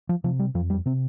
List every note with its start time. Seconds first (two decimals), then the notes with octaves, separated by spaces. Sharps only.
0.09 F3
0.24 C3 F3
0.39 G3
0.54 F2 F3
0.70 G3
0.86 C3 C4